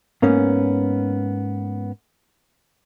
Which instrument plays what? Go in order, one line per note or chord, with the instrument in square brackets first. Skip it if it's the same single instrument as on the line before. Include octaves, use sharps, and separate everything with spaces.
[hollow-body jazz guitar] G#2 A#3 B3 C#4